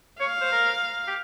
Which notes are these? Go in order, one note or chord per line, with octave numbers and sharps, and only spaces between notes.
C#5 F5
C5
A#4
G4